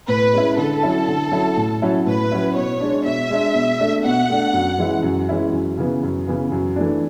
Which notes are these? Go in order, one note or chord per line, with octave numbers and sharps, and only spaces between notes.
A2 B4
G#3 C#4 E4
D3 A4
F#3 C#4 E4
D3
F#3 C#4 E4
A2
F#3 C#4 E4
A2 B4
F#3 C#4 E4
B2 C#5
G#3 D4
B2 E5
G#3 D4
B2
A3 D4
B2 F#5
A3 D4
F#2
E3 G#3 C#4 E4
F#2
E3 G#3 C#4 E4
F#2
C#3 E3 B3
F#2
C#3 E3 B3
F#2
E3 A3 D4